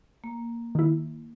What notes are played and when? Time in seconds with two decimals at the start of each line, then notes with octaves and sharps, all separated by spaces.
0.24 A#3
0.75 D#3 E4